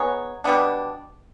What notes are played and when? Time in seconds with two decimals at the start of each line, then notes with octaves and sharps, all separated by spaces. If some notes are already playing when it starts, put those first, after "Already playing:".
Already playing: B3 D#4 G#4 C#5
0.44 B2 G3 B3 D4